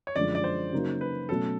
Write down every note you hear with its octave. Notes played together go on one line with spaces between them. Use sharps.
C#5
F#2 D3 F3 G#3 D5
D5
C5
C#3 F#3 A#3 D#4 F#4
B4
B2 F#3 A3 C#4 A4